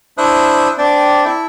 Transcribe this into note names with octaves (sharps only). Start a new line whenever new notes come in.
D4 E4 C5 E5 D#6 F#6
C4 D4 D5 G5
E4 A4 E5